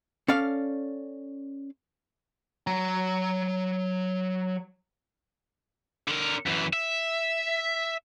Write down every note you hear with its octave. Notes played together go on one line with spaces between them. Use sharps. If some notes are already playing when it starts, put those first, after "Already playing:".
C#4 A4 D5 F5
F#3 A#5
D3 A#4
F#2 E3
E5